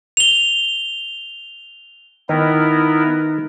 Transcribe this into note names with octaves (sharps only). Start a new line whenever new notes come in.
F7 G7
D#3 B3 D#4 E4 A#4